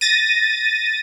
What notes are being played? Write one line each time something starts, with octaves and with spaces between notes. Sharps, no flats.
A6 A#6 D#7